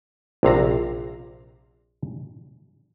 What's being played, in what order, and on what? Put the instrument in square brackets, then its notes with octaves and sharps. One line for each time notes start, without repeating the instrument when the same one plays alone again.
[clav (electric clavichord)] A#1 C3 F5 A#5